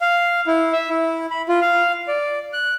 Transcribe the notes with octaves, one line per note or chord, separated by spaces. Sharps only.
F5
E4
E5
E4
B5
F4
F5
D5
F#6